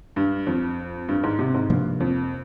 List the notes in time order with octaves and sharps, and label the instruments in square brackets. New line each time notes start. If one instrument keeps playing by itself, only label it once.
[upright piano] G2
F2
G2
G#2
C3
G#2
[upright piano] G2 [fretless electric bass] C3 F3 A#3
[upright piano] F2